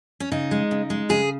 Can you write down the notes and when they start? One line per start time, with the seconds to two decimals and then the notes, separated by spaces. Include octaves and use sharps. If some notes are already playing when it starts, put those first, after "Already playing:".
0.20 C#4
0.32 C#3 D#4
0.51 G#3
0.71 C#3
0.90 G#3
1.09 C#3 G#4